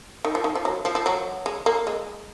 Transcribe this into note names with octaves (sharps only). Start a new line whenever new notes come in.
D#3
F3
D#3
F3
F#3
F3
F3
F#3
G#3
A#3
G#3